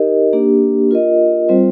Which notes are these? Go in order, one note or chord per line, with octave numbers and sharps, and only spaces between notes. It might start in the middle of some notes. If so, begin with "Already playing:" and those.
Already playing: D#4 G4 A#4 D#5
A#3 D4 G4
F4 A#4 D#5
G3 C4 F4 C5